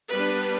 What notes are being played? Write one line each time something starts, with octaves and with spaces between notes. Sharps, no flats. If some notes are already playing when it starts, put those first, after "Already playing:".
G3 B3 D4 B4